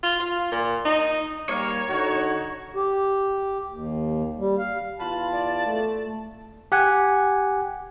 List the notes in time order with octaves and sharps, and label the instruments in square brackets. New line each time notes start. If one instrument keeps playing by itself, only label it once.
[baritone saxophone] F4
F4
A#2
D#4
[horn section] G3 A#3 [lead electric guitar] C#5
[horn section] D3 D#4 F#4
[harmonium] G4
D#2
G3
F5
[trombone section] E2 F4 [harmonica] A5 [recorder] B5
[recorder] D5
[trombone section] A3
[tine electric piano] G4 F#5 G#5